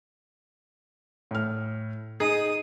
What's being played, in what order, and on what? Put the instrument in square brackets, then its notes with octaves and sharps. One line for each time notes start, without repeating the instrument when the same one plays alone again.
[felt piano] A2 F6
[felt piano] D#4 [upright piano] G#4 [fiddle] D#6